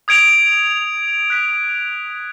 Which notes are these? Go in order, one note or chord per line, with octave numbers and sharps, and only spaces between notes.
D#6 G#6 D7 F7
F#6 B6 F7